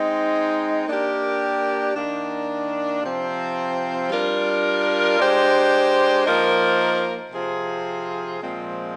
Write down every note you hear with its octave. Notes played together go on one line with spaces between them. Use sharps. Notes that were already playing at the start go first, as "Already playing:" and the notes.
Already playing: G#3 C4 D#4
A#3 D4 G4 A#4
D#3 A#3 D4
C3 F3 C4
G3 D4 F4 A#4
G#3 D4 G4 C5
F3 A#3 D#4 A#4
C3 F3 C4 F4 G#4
A#2 F3 G#3 C4